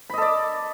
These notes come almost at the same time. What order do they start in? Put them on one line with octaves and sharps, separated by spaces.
B5 D#5 A4 D5